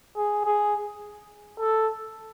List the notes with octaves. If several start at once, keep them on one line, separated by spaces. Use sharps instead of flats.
G#4
G#4
A4